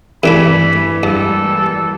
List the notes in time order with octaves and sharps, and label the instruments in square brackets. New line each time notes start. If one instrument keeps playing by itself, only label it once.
[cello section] G2 A3 [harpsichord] C3 D4 A4 [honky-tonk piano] E3 [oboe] B5
[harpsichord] G2 [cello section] G3 G#3 A#3 [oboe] A4